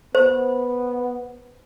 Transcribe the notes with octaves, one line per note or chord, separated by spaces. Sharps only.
B3 C5